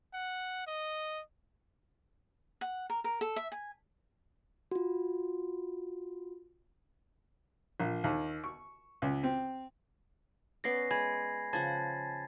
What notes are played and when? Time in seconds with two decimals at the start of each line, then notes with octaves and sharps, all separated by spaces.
0.14 F#5
0.67 D#5
2.61 F#5
2.90 A#4
3.04 A#4
3.21 A4
3.36 E5
3.52 G#5
4.71 F4 F#4
7.80 A#1
8.04 D#2
8.44 C#6
9.02 C#2
9.23 C4
10.64 B3 C#4 D5 A#6 C7
10.91 G#3 G#5 B5 G#6
11.53 C#3 F3 F#5 A5 G#6 A6